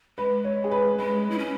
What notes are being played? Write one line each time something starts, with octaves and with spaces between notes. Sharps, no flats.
G#3 B4
C#5
G#4
B4
G#3 B4
E4
C#4